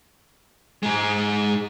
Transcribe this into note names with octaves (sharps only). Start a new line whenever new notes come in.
G#2 G#3